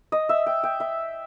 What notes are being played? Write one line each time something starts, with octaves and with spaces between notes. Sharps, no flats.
D#5
E5
G5
G5
E5